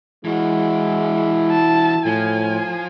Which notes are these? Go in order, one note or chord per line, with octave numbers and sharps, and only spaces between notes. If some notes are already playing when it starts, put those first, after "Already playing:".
E3 G#3 E4 F#4
A5
A2 F3 G#5